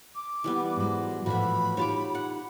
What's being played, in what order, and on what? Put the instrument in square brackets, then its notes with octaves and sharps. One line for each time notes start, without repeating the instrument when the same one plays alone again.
[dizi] D6
[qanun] E3 G3 B3
[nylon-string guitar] G#2 F#3
[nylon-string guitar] A2 E3 F3 [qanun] F#4 E5 [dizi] B5
[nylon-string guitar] D#4 F4 G4 [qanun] C#5 A5 D6
[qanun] F#5